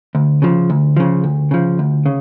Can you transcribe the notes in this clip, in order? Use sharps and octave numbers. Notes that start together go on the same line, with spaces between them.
D2
C#3 F3
D2
C#3 F3
D2
C#3 F3
D2
C#3